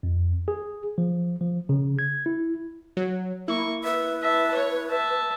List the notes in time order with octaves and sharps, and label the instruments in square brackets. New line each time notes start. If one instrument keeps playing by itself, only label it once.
[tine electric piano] F2
G#4
F3
F3
C#3
G#6
E4
[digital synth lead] F#3
[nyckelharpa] A#3 C#6 [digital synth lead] E4
[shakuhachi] B4 [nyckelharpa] E5
[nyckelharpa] E5 A5
C#5
E5 A5